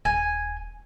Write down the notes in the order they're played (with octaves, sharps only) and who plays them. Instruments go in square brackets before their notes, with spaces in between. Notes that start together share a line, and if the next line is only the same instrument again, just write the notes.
[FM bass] D#1 [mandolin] G#5